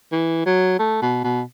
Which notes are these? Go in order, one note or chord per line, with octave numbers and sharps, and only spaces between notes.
E3
F#3
A3
B2
B2